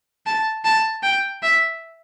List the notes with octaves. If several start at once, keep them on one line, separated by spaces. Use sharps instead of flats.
A5
A5
G5
E5